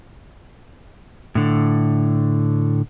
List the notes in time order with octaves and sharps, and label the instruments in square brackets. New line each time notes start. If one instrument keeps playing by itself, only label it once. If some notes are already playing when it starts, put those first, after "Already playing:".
[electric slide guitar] A2 D3